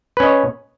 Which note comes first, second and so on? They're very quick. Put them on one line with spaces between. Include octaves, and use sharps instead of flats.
B4 C#4 D#5 C#5